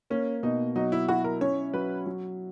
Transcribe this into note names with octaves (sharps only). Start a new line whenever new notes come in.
A#3 C#4
B2 D#4
F#3 D#4
E4
E4 F#4
A#4
C#4 C#5
F#3 B4
F#3